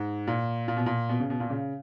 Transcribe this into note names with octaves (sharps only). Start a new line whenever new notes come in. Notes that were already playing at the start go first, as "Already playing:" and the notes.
Already playing: G#2
A#2
A#2
B2
A#2
B2
C#3
B2
A#2
C#3